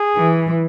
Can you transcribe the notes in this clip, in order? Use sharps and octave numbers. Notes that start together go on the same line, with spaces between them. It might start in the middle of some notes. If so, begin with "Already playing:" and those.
Already playing: G#4
E3